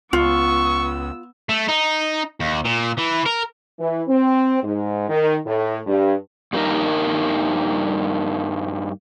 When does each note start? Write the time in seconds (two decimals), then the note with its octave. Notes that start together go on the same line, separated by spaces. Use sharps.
0.13 C#2 B3 F4 C#6 E6
1.49 A3
1.69 D#4
2.40 D#2
2.65 A#2
2.98 E3
3.26 A#4
3.79 E3
4.08 C4
4.63 G#2
5.08 D#3
5.45 A2
5.86 G2
6.53 G2 G3 A#3 B3 D#4 A#4